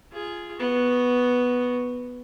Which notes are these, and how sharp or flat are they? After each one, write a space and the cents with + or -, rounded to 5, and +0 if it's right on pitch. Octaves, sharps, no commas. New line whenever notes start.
F4 -15 G#4 +0
B3 +0 F#4 +0